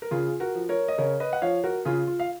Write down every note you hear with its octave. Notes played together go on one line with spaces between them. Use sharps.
A#4
C#3 F4 G#4
F#4 A#4
F3
A#4 C#5
D#5
C#3 A#4 C#5
B4 D#5
F#5
F3 C#5 F5
F#4 A#4
C#3 F4 G#4
F4
F5